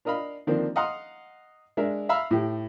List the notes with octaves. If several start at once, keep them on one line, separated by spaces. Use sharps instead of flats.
D4 A#4 D#5 F5 B5
D3 D#3 F3 A#3 C4 D4
D#5 F5 F#5 A#5 C6 D#6
G#3 D4 A#4 E5
E5 F5 A#5 B5 E6
A2 G4